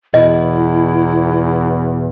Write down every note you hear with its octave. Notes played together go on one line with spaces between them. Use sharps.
E2 B2 E4 D#5